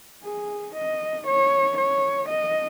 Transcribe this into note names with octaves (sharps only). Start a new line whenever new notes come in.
G#4
D#5
C#5
C#5
D#5